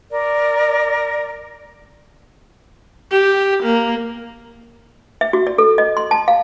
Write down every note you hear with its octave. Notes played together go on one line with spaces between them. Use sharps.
A#4 D5
G4
A#3
E5
F#4
D5
A4
D#5
C6
A5
F5